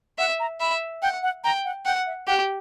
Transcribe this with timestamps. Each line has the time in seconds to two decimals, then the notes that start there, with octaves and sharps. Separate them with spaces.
0.18 E5 F#5
0.40 A#5
0.60 E5 B5
1.02 F#5 G5
1.23 F#5
1.44 G5 A#5
1.65 F#5
1.85 F#5 G5
2.06 E5
2.27 G4 F#5